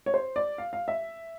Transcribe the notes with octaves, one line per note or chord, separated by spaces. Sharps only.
C#5
C5
D5
F5
F5
E5